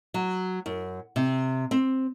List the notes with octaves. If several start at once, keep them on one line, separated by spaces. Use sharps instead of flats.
F#3
F#2
C3
C4